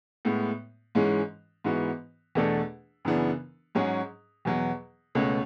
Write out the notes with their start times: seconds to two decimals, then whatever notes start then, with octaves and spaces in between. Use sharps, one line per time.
0.25 A2 G#3 B3
0.95 G#2 E3 G#3 C#4
1.64 G#2 E3 B3 F#4
2.35 E2 B2 A3 D4 A4
3.05 F#2 C#3 E3 B3 D4
3.75 G#2 F#3 C#4 G#4
4.45 E2 B2 F#3
5.15 C#2 B2 A3 C#4